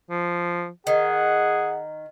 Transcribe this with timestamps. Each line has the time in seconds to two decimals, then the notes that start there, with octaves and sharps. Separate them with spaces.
0.10 F3
0.87 D#3 G#4 F#5